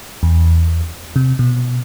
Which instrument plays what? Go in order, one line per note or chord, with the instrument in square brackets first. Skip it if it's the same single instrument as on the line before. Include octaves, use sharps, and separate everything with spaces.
[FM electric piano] E2
C3
B2